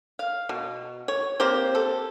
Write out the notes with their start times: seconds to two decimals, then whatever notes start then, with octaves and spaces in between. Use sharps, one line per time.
0.19 F5
0.49 B2
1.08 C#5
1.40 A#3 C4 G4 C5
1.75 A4